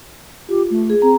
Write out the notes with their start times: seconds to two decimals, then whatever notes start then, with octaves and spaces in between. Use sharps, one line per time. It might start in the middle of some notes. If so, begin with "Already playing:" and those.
0.49 F4 G4
0.70 A3
0.90 G#4
1.02 C4 A#5